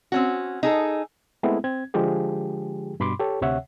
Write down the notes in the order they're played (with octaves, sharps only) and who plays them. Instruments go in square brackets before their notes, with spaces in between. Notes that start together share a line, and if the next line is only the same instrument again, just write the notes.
[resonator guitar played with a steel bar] C4 C#4 F#4
D#4 G#4 A4
[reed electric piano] G#3 A3 B3 C4 E4
C4 G#6
D3 F3 G#3 G4 G#4
G2 B2 B5 C6 D6
G4 A4 C#5
D2 C3 C#5 E5 F#5